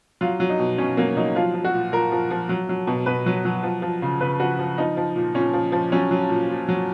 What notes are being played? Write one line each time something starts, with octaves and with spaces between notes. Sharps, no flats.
F#3 F4
F#3
D#4
B2
B2 C#4
F#3 A#3
F#3 D#4
F3 F4
F3
F#4
A#2
A#2 A#4
F3
F3
F#3
F#3
B2
B2 B4
F#3
F#3
F3
F3
C#3
C#3 B4
F3 F#4
F3
F3 D#4
F3
A#2
A#2 C#4
F3
F3
F#3 C#4
F#3
A#2
A#2
F#3